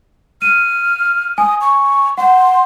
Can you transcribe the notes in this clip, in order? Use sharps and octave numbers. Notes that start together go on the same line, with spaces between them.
F6 D#7
G#5 D#6
C#6
F#5 C6